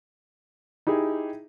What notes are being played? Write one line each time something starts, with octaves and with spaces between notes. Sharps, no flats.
D#4 E4 G4 G#4